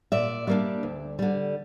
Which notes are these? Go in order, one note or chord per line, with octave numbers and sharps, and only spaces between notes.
A#2 D5 E5
G3 A#3 D4
D2
D3 G3